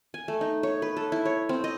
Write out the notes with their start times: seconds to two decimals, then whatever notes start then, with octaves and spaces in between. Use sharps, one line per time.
0.14 G#5
0.28 A3
0.41 D#4
0.63 C#5
0.82 B4
0.97 A4
1.12 E4
1.25 C#5
1.49 C4
1.64 D#5